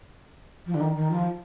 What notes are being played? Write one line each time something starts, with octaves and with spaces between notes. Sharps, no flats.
F3
D3
D#3
D#3
F3